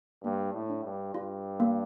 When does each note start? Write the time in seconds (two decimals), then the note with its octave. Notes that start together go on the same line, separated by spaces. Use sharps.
0.23 G2 A#3
0.54 A2
0.70 D4
0.84 G2
1.14 G2 F4
1.60 A#3